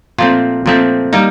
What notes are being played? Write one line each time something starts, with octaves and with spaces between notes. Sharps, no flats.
A#2 F3 A3 C4 F4
A#2 F3 A3 C4
G3 A#3 D#4